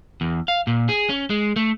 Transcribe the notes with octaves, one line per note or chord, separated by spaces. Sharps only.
E2
F5
A#2
G#4
C#4
G#3
A3